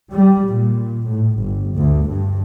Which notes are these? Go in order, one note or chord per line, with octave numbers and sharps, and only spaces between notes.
G3
A#2
A2
G1
D2
G2